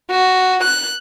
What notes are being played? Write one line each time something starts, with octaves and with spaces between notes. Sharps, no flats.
F#4
F#6